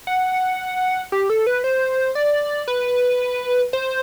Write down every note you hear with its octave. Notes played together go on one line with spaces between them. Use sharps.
F#5
G4
A4
B4
C5
D5
B4
C5